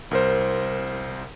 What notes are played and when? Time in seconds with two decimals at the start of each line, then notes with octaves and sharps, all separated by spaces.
0.11 C2 A#4 C5